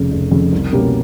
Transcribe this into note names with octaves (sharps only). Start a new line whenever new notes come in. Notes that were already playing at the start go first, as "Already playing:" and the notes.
Already playing: F1 F2 C#3
F1
F2 C#3
C2
B2 G3 A#3 C#4